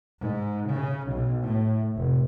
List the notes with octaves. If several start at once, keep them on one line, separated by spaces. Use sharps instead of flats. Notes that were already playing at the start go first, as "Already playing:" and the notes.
G#2
C#3
B1
A2
F1